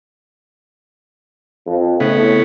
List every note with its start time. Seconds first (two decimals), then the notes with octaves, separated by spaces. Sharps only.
1.67 F2
2.00 A2 C#3 B3